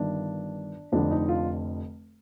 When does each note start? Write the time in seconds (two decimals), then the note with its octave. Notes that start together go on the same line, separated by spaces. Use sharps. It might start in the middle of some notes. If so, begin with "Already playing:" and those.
Already playing: G1 G2 D#3 D4
0.92 F1 F2 D3 D4
1.11 D#4
1.29 F4